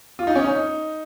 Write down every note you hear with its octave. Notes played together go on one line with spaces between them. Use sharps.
F4
D#4
C#4
D#4